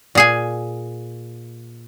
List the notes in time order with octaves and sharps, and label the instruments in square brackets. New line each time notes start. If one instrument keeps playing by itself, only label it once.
[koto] A#2 G#4 G#5